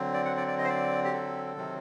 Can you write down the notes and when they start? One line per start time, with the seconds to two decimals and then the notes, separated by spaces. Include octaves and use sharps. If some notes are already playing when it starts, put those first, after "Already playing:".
Already playing: D3 F#3 C4
0.14 D5
0.25 F#5
0.37 D5
0.48 D5
0.58 D#5
0.65 C5
0.70 D5
1.04 G4
1.13 A4
1.56 C3 D#3 F#3 C4